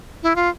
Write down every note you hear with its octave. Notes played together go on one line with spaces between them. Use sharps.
E4
F4